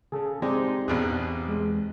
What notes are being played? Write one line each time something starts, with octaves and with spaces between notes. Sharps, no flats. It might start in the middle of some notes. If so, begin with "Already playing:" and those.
C#3 G#4 A4
G#3 C4 D#4 G4 D5
A#1 E2 B2 G#4 F#6
G#3